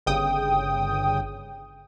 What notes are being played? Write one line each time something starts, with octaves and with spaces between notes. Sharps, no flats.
G1 C#3 G5 D#6